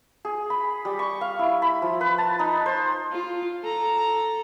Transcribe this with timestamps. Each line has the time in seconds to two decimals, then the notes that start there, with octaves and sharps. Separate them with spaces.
0.25 G#4
0.50 B5
0.85 G3
0.99 C#6
1.21 F5
1.39 E4
1.62 B5
1.82 F3
2.01 B4
2.18 A5
2.39 D#4
2.66 C5
3.11 F4
3.63 A4 A#5